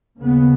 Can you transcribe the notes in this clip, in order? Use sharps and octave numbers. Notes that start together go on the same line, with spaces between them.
D#2 C#3 B3